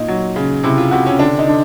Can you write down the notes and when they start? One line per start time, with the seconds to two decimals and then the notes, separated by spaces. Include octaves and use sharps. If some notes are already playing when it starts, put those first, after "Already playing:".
Already playing: A#2 D#4
0.08 F#3
0.36 C#3
0.64 C3 E4
0.77 F4
0.91 C3 F#4
1.06 C#4
1.19 D3 D4
1.39 D#4
1.48 D3